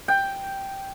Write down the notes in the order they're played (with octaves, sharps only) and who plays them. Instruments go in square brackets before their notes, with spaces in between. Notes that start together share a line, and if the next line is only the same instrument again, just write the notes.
[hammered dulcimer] G5